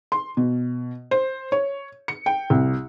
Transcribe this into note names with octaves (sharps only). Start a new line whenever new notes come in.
C6
B2
C5
C#5
C#7
G5
C2